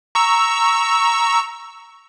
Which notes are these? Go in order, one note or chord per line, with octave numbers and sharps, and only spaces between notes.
A#5 C#6 E6